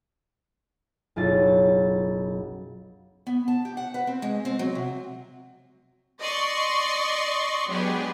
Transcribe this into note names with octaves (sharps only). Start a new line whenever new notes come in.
F#1 B1 F4 A6
B3
A5
G4
F#5
B4
C4
G#3
C4
F#3
C3
D5 D#5 C6 C#6
F#3 G#3 B3 D4 G4 G#4